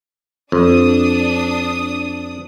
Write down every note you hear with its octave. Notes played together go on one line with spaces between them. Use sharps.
F2 D4 D#6